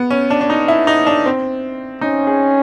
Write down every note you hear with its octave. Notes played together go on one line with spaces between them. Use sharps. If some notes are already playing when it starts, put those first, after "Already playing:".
Already playing: B3
C#4
D4
D4
D#4
E4
D#4
D4
C4
C#4 D#4
G#4